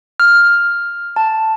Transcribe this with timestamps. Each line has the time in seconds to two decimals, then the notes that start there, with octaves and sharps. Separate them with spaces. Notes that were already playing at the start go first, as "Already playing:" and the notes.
0.20 F6
1.16 A5